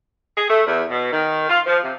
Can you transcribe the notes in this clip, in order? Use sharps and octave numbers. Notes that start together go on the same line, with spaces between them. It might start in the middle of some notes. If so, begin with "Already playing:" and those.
G#4
A3
E2
B2
D#3
F4
F3
C3